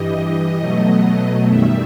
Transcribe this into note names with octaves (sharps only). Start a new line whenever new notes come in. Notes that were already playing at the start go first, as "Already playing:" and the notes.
Already playing: G2 E3 G3 D#5
B2 F#3 A3
F#2 D#3 G3 E5